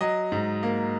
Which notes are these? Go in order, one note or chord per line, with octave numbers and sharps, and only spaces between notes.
F#3 D#5
G#2
A#3